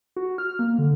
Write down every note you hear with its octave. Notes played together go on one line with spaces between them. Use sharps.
F#4
F6
A#3
D3